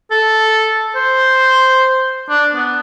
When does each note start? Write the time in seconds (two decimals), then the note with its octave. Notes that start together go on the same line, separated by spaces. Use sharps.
0.11 A4
0.96 C5
2.30 D4
2.55 B3